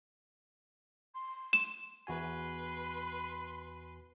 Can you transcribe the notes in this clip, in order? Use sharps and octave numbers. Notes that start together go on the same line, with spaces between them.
C6
E7
E2 F#4 B4 G#5 C6